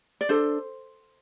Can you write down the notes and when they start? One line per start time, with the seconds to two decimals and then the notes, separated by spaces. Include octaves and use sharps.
0.21 D5
0.29 D4 A4 C5